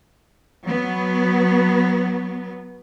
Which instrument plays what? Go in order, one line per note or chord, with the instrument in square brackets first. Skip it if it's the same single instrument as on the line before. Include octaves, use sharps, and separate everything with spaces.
[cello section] F#3 B3